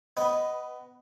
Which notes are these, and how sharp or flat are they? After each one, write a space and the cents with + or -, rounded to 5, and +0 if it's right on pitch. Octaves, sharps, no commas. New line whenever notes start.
B3 +20 B4 +0 D#5 +0